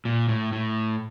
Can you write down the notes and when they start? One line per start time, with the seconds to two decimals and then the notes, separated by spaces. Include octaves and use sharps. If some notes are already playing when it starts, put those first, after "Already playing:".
0.05 A#2
0.28 A2
0.52 A2